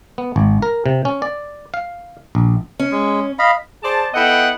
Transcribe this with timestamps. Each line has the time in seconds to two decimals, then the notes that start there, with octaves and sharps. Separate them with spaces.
0.18 B3
0.36 G#1
0.62 A#4
0.86 C3
1.05 C#4
1.22 D5
1.74 F5
2.35 A#1
2.79 C#4
2.92 G#3
3.39 D#5 F5 B5
3.83 G#4 C5 D5 A5
4.14 B3 E4 A4 D#5 F#5 G5